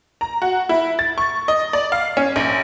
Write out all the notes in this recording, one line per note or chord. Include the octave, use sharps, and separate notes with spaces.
A#5
F#4
E4
A6
C#6
D#5
D5
F5
C#4
A#1